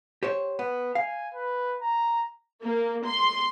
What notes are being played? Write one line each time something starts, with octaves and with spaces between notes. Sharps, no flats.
G4 C5 C#5
B3
F5 G#5
B4
A#5
A#3
C6